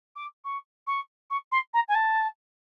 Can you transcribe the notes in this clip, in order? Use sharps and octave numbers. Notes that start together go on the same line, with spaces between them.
D6
C#6
C#6
C#6
C6
A#5
G#5
A5